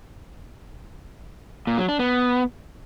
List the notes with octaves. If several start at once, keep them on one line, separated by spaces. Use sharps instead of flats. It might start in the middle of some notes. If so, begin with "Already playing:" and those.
A#2
F#3
D4
B3